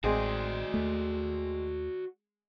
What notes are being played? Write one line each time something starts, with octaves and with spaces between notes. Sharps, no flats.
A1 G#3 C4 F#4 G#4 D5
D#2 A3